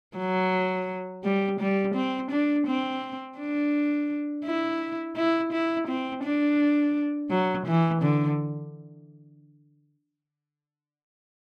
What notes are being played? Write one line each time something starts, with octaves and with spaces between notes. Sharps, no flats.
F#3
G3
G3
C4
D4
C4
D4
E4
E4
E4
C4
D4
F#3
E3
D3